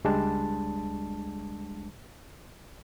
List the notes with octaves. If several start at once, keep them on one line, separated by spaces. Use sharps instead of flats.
C#2 G3 G#3 D4 A5